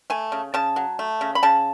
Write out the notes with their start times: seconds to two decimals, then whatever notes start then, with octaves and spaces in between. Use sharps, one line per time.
0.10 A3 G#5
0.32 C#3
0.54 C#3 A5
0.76 F#3
0.99 A3
1.21 C#3
1.35 B5
1.43 C#3 A5